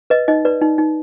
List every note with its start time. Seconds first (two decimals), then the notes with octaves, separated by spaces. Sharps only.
0.10 B4 D#5
0.28 D#4 D#5
0.45 B4 D5
0.62 D#4
0.78 D#4